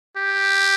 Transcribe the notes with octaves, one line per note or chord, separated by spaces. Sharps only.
G4